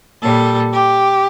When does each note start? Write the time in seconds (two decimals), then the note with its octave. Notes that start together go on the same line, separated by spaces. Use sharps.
0.22 A#2 G3 A4
0.72 G4